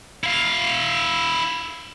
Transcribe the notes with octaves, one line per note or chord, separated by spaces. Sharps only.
E4 F5